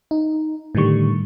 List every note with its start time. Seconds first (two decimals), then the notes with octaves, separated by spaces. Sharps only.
0.11 D#4
0.75 A2 D3 D#3 G3 C#6